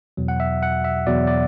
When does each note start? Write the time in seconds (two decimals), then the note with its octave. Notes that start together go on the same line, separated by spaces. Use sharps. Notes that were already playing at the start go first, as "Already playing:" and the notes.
0.17 E2 B2 F#3
0.28 F#5
0.40 E5
0.63 F#5
0.84 E5
1.07 E2 B2 F#3 D5
1.27 D5